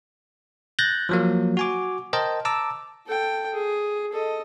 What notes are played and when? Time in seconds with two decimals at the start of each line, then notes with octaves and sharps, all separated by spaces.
0.79 F#6 G6 A6 A#6
1.09 F3 F#3 A#3
1.57 F#4 G#5 D6
2.13 A#4 C5 D#5 G5 A5
2.45 A5 A#5 D6 E6
3.07 A4 G5
3.54 G#4
4.13 A4 D#5